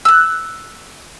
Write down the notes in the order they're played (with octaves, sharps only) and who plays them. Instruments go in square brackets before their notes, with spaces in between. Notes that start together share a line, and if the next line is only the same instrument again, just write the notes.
[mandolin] E6 F#6